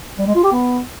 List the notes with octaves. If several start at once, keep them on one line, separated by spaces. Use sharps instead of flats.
G3
G#3
F4
G4
B3